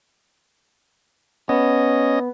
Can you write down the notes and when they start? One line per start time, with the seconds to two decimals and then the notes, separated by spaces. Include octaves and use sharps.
1.49 B3 C#4 D#5